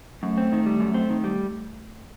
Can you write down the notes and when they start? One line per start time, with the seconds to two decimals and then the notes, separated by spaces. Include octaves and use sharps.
0.23 F#2 A3
0.38 C4
0.52 D#3
0.66 G3
0.80 F#2
0.94 C4
1.10 D#3
1.24 G3